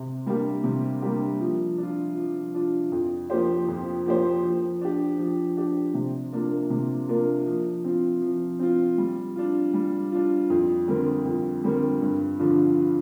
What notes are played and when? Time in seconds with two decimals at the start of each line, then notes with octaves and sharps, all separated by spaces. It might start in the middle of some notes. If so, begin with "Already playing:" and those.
Already playing: C3
0.26 G3 A#3 D4 G4
0.64 C3
1.02 G3 A#3 D4 G4
1.40 F3
1.78 D4 F4
2.16 F3
2.54 D4 F4
2.92 F2
3.30 F3 A#3 G4 C5
3.68 F2
4.06 F3 A#3 G4 C5
4.43 F3
4.81 D4 G4
5.19 F3
5.57 D4 G4
5.94 C3
6.32 A#3 D4 F4 A#4
6.70 C3
7.09 A#3 D4 F4 A#4
7.46 F3
7.84 C4 F4
8.21 F3
8.59 C4 F4
8.98 G3
9.36 D4 F4
9.74 G3
10.12 D4 F4
10.50 F2
10.88 D3 G3 C4 A#4
11.25 F2
11.63 D3 G3 C4 A#4
12.01 G2
12.39 D3 F3 D4 F4